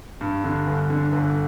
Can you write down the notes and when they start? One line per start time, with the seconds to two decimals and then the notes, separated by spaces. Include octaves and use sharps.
0.21 G2
0.44 D3
0.67 G1
0.90 D3
1.12 G1